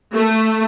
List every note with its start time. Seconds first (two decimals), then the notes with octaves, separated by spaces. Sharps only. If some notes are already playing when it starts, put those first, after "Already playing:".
0.14 A3